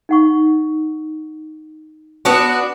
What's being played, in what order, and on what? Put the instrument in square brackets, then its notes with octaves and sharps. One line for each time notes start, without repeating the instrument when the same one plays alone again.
[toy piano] D#4 F#5 C#6
[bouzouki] B3 D4 F#4